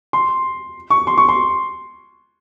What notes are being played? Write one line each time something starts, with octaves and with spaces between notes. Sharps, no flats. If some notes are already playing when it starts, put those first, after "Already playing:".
C6
C#6
C6
C#6
C6